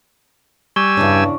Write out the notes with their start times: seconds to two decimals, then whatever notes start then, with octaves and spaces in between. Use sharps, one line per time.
0.76 G3 G#5 C#6 E6
0.97 E2 G2 C#3 D4